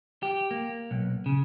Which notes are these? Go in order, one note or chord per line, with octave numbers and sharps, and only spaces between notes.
G4
A#3
B1
C#3